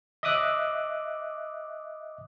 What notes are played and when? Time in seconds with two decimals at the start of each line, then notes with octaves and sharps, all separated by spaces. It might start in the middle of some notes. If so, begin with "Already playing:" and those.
0.23 D#5 E5 D6 D#6 F#6